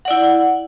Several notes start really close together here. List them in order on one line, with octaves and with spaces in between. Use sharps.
F#5 D5 E4